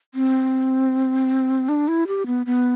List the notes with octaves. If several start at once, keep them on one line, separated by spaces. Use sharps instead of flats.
C4
D4
E4
G4
B3
B3